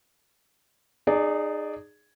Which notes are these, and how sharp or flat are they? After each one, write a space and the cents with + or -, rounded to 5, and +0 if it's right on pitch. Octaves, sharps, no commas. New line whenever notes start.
D#4 -30 G#4 +0 D5 -5